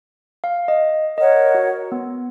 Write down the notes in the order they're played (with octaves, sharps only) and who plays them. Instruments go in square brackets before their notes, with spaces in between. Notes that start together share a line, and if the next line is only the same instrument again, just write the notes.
[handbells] F5
D#5
[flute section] A#4 C#5 F#5 [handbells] D#5
[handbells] F#4
B3